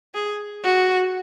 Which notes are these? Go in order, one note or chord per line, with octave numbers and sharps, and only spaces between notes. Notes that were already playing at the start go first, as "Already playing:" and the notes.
G#4
F#4